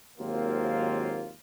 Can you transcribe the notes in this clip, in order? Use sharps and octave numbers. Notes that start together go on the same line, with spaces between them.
G#1 D#2 F#3 A#3 C4 F4